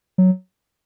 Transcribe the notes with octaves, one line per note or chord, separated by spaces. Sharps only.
F#3